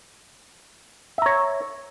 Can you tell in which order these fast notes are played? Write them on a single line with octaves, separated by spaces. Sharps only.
E5 A#5 C#5